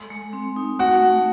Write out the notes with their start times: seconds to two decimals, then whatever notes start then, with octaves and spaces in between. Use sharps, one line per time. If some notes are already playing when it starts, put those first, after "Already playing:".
Already playing: G#3 A4
0.10 G#3
0.33 C4
0.56 D#4
0.79 A3 F#4
1.02 A3